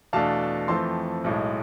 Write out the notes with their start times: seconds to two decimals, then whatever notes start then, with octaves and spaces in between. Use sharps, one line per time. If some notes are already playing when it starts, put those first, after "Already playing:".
0.13 E2 B2 A3 D4 F5 A5
0.68 F2 E3 A3 C4 A5 C6
1.24 B1 A2 G#3